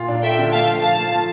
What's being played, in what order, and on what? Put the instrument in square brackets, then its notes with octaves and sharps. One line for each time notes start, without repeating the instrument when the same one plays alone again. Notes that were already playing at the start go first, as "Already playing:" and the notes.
Already playing: [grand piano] A#2 F4
D4
[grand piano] A3 [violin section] E5 G5
[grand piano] D3
[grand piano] A3 [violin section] F5 A5
[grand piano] F3
[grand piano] A3 [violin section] F5 A5
[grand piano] A3
F3